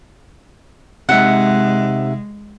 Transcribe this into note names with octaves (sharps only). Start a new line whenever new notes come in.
C3 G#3 D#4 E5 F#5